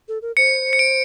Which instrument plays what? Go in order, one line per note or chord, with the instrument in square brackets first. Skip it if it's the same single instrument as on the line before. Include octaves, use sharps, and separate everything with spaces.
[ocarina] A4
A#4
[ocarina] C5 [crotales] C#7
[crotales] C#7
D7